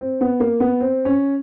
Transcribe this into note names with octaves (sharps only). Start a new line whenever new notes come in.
C4
B3
A#3
B3
C4
C#4